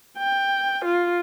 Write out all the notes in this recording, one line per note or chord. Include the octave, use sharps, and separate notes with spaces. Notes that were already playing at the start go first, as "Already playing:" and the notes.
G5
F4